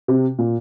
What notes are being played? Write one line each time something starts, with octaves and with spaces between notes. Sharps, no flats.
C3
A#2